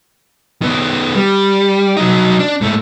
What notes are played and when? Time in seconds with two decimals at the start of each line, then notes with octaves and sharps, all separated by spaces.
0.62 D#3 B3
1.15 G3
1.97 F#3 D#4
2.39 D4
2.61 G#2 A3